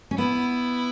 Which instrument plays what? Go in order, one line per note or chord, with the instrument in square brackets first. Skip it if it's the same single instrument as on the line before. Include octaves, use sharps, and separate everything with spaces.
[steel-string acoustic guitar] C#4
[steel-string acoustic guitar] B3 [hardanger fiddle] E4